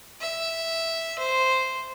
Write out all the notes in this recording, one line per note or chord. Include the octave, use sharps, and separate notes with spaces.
E5
C5